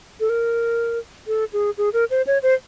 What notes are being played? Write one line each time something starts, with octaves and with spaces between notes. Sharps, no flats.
A4
A#4
A4
G#4
G#4
A#4
C5
C#5
C5